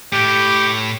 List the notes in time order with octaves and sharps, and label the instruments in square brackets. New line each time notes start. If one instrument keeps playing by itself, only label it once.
[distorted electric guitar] A2 [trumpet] G4